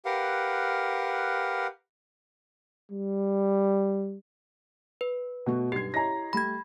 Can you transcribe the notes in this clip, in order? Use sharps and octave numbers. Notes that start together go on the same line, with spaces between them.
G4 A#4 B4 F5 F#5
G3
B4
B2 A3 B3 F#4
B1 G2 G4 G#6 C7
E4 C#5 D#5 A#5 A#6
G3 A3 B5 G#6